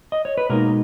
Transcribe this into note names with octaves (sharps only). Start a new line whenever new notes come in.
D#5
C#5
B4
B2 G#3 A#3 D#4 A#4